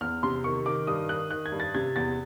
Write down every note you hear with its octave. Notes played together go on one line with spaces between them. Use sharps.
E2 F6
C3 C6
D#3 C#6
D#3 D6
G2 D#6
D#3 F#6
D#3 F#6
G#6
G2
A6
C3 G#6
E2 A6